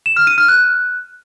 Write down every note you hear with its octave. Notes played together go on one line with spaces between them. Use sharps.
E7
F6
D#7
F6
F#6